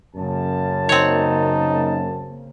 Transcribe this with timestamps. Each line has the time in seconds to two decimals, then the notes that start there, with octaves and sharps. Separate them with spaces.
0.16 F#2 C#3 A#3 A5
0.89 C4 D#4 C#5